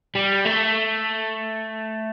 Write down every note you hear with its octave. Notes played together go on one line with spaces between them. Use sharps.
G3
A3